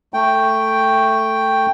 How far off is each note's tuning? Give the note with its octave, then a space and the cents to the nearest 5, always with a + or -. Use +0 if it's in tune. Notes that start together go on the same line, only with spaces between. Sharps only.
A3 +10 G5 +0